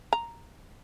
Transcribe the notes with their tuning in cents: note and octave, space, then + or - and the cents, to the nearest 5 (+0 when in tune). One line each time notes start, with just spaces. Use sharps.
A#5 +0